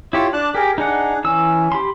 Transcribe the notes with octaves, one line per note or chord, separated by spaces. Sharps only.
E4 F4 G4 C#5
D4 D5 A5 F#6
G4 G#4 A#4
D4 D#4 G#4 F#5
E3 C#4 E6
G4 B5 C6